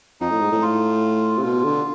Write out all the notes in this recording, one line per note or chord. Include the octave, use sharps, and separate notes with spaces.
F2 D#4
A2
G#2
A2
F4
C3
B2 F4
D3